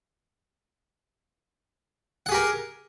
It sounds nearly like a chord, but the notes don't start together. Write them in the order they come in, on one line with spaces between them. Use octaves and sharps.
F#5 G#4 G4 A#4